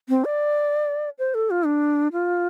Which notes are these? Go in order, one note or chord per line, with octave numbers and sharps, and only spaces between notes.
C4
D5
C5
A4
F4
D4
F4